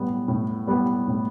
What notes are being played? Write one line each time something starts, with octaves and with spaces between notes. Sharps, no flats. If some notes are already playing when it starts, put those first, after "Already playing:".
Already playing: A2 G3 B3
A2
G3 B3
A2